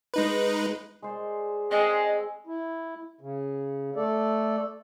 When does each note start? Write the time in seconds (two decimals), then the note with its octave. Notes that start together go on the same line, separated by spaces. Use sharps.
0.14 G#3 D#4 B4
1.02 G#3 C5 D5
1.71 G#3 C4 G#4 D#5 G#5
2.47 E4
3.21 C#3
3.96 A3 A4 D5